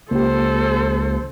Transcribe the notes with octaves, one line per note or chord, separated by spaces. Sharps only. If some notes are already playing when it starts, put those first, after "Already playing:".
C#2 A#3 G4 A4 C5